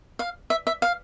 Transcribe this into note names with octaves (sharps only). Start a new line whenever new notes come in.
F5
E5
E5
F5